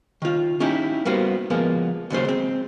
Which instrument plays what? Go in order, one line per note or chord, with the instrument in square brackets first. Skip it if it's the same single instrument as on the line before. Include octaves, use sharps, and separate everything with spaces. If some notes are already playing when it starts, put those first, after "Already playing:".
[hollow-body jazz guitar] D#3 F4
C#4 D#4 E4 G4
G3 A#3 B3 F#4 C5
F3 G#3 A#3 B3
D#2 C#3 F#3 C5
G#3 C4